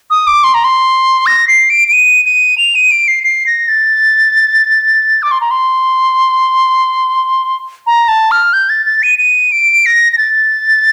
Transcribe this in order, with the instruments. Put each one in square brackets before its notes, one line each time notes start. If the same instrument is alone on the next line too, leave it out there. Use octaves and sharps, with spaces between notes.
[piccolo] D#6
D6
C6
A#5
C6
A#6
C7
D7
D7
D#7
D#7
F7
D#7
D7
C7
C7
A#6
A6
D6
C6
A#5
C6
A#5
A5
F6
G6
A6
A6
D#7
D#7
D7
A#6
A#6
A6